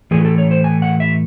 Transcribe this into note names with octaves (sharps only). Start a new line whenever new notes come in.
A2 E3 A3 G#4
A4
C#5
C5
G#5
F#5
E5